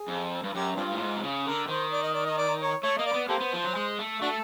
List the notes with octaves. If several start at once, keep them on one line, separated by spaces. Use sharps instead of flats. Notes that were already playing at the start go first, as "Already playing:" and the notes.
Already playing: G#4
F2
G2
F#2 G4
G2 C4 D4 F4
A2
G#2
C3
C#3
D3 A#4
D#3 C5
D5
D#5
D5
D#5
D5
C#5
A3 C#5
A#3 D#5
D5
B3
A#3 G4 A4 C5
B3
F3
F#3
G#3
A3
A3 D4 F#4 A4